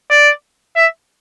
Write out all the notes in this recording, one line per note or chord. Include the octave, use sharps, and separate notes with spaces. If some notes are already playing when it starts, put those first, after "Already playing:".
D5
E5